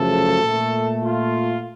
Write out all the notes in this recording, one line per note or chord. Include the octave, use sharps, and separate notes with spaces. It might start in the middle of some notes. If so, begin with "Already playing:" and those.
Already playing: F#2 C#3 F3 A3 A4
A#2 A3
F4